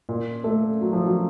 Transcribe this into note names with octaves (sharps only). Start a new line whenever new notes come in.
A#2
A3
F#3
F3
F#3